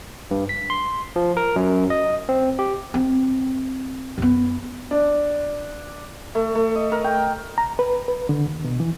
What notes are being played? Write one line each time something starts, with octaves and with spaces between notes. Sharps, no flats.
G2
B6
C6
F3
A#4
F#2
D#5
C4
G4
C4
F#2 B3
D4
A3
A3
D#5
A#4
G5
A#5
B4
B4
D3
D#2
B2
E3